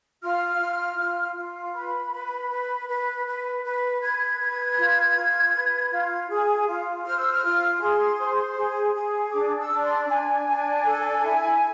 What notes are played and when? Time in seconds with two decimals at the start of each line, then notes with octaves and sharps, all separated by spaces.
0.22 F4 F6
0.60 F4
0.98 F4
1.36 F4
1.74 B4 B5
2.12 B4
2.50 B4
2.88 B4
3.26 B4
3.64 B4
4.01 B4 G#6
4.39 B4
4.77 F4
5.15 F4
5.53 B4
5.91 F4
6.30 G#4
6.67 F4
7.05 C5 F6
7.18 E6
7.32 F6
7.43 F4
7.80 G#4 C6
8.19 C5
8.57 G#4
8.94 G#4
9.32 D4 D6
9.58 E6
9.71 D4
9.83 C6
10.09 D4 G#5
10.46 D4
10.84 A4
11.22 E4